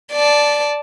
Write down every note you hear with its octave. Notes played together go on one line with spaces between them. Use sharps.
D5 A5